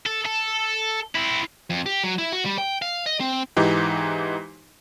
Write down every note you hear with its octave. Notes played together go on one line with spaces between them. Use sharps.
A4
A4
C4 E4
F2
G4
F#3
E4
F#4
G3
G5
F5
D#5
C4
G#2 E3 D#4 G4